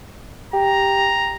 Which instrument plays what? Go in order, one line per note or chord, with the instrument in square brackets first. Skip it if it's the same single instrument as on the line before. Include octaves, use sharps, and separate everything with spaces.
[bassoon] G4 [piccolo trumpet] A#5